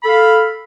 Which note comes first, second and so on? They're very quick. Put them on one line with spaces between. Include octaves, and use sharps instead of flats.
B5 A4 F5